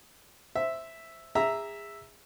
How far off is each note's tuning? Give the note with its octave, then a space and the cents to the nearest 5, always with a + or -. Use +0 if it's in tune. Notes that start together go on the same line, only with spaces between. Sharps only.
C5 +0 E5 +0
G#4 -25 E5 +0 A#5 +0